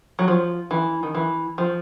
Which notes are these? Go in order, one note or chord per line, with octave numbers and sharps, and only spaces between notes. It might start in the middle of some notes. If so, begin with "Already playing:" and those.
F#3
F3
E3
D#3
E3
F3